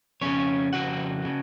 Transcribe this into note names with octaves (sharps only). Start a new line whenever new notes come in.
F2 C#3 C#4 C#5
F2 C#3 F#4 F#5
C#3